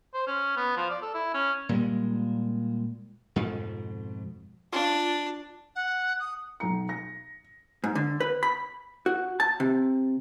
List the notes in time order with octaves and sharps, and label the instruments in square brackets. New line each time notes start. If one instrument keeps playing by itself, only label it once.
[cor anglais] C5
C#4
B3
F3
D5
A4
E4
C#4
[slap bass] A#2 G3 G#3
F2 G#2 B2
[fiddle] D4 [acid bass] F4
[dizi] F#5
D#6
[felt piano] B1 A#5 C#7
A#6
[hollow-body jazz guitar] G#2
D3
B4
B5
F#4
A5
C3